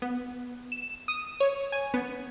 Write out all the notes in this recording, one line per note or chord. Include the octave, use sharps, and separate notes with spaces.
B3
E7
D#6
C#5
G#5
B3